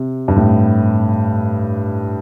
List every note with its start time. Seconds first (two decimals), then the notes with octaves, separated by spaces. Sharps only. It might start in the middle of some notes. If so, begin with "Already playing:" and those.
Already playing: C3
0.28 G2
0.36 A2